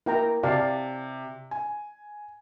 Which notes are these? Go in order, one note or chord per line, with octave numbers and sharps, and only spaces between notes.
A#3 E4 G5 A#5
C3 D5 F5 A5
G#5